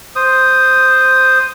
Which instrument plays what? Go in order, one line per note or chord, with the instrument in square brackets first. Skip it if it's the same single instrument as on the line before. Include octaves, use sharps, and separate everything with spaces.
[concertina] C5 D#6